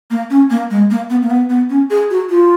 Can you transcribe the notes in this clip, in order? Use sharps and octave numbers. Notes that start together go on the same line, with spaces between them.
A#3
C#4
A#3
G#3
A#3
B3
A#3
B3
B3
C#4
G#4
F#4
F4